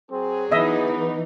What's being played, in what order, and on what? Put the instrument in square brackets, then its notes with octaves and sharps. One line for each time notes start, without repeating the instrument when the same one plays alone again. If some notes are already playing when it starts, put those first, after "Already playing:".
[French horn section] F#3 G#4 [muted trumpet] C4
[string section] E3 D#4 [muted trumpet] B3 [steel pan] D#5 E5